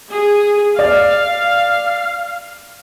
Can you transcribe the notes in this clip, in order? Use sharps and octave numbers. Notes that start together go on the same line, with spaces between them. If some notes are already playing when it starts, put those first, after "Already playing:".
G#4
D5 F5